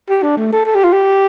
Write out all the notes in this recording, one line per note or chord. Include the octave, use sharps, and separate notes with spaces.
G4
D4
A3
A4
A4
G4
F4
G4